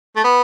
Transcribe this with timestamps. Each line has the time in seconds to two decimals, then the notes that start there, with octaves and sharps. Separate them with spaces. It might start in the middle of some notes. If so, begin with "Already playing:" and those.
0.16 A3
0.24 B3